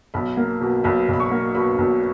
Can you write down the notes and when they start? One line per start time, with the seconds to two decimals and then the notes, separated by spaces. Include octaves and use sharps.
0.14 B1 B5
0.37 A#3
0.61 B2
0.84 B1 B5
1.08 B1 B5
1.20 C#6
1.31 A#3
1.55 B2 B5
1.78 B1